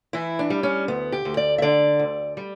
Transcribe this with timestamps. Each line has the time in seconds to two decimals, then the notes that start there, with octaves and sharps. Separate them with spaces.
0.13 E3 E4
0.39 D4
0.50 G3
0.63 C#4
0.88 D2 B3
1.12 G4
1.25 D2
1.37 D5
1.58 E5
1.62 D3 D5
1.99 D2
2.37 G3